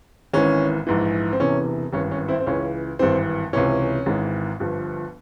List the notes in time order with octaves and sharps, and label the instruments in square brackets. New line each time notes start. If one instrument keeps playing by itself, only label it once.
[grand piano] G#1 G#2 E3 C#4
A#1 G#2 E3
C4
E1 E2 C3 E3 C#4
G#1 G2 E3 C#4
C#4
C4 E4
C4
C#2 C#3 E3 C#4
G#1 G2 E3 C4
C#2 C3 E3 C#4
G#1 G#2 E3
G1 G2 F3